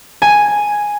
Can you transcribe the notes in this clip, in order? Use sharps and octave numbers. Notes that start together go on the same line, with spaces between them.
G#5